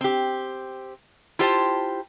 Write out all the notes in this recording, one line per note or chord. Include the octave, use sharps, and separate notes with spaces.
C4 G4
E4 F4 G4 C5 G5 A5